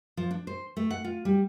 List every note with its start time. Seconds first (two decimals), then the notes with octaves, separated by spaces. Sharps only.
0.17 F3
0.31 D4
0.47 C5
0.77 A3
0.91 F#5
1.05 F4
1.25 G3